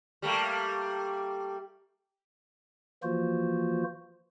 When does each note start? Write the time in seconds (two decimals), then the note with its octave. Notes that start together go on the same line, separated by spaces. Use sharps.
0.22 G3 A3 A#3
3.03 E3 F3 A#3 F4 F#4 C5